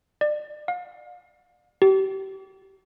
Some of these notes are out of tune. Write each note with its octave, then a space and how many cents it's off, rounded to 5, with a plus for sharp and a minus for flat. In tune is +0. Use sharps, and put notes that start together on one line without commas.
D5 +30
F5 +40
G4 -30